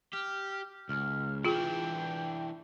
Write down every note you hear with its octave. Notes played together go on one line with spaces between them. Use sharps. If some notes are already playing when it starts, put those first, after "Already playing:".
G4 F6
C#2 F6
E3 D4 F4 G#4 G5